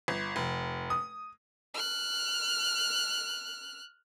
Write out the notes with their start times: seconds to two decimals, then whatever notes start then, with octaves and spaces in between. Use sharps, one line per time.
0.08 G1
0.36 F1
0.90 D#6
1.74 F6 F#6